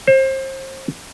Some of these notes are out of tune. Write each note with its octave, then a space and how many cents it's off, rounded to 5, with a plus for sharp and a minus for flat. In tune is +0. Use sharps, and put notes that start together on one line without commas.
C5 +30